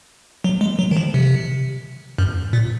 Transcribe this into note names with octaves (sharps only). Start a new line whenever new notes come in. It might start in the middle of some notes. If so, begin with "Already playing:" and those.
F#3
G#3
F#3
D#3
F3
C3
F#2
A#2